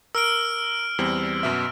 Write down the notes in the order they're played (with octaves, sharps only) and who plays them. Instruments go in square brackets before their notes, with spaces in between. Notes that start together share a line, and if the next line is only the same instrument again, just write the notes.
[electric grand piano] A#4 [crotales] E6 F6 D7
[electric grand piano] E2 G3 C4
F#2 B2 E5